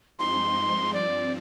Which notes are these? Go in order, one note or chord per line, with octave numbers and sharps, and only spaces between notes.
G2 F3 G#3 C4 D#4 C6
G2 F3 C4 D5